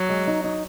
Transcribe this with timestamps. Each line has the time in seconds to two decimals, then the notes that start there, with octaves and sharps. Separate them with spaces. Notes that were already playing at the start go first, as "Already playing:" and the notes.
Already playing: F#3
0.09 G#3
0.27 D#4
0.44 D#4